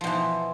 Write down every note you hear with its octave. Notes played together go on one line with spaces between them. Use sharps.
B2 E3 F3